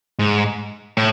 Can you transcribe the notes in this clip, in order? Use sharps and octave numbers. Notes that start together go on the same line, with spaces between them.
G#2
A2